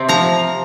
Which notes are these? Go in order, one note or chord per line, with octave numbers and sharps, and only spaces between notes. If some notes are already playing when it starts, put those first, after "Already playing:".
Already playing: C3 C4
F3 A#5